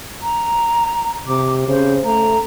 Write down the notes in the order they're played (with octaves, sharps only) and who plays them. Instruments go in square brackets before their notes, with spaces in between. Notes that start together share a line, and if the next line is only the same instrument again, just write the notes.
[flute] A#5
[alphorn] C3 [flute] D6
[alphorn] C#3 [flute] C5
[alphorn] A3 [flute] A#5